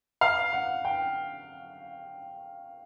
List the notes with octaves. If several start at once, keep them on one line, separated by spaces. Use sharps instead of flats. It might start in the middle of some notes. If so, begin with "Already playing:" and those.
F5
F#5
G5